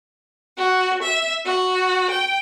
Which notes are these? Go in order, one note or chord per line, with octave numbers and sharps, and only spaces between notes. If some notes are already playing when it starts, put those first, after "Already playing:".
F#4
E5
F#4
G5